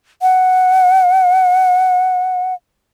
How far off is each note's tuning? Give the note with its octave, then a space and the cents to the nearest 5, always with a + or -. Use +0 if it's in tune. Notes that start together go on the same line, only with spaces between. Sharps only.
F#5 +0